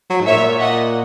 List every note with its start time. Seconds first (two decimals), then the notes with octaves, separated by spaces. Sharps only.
0.10 F#3
0.20 G#2
0.26 A#2 C#5 E5
0.60 D#5 F#5